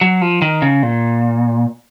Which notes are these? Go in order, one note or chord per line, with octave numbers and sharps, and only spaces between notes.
F#3
F3
D#3
C#3
A#2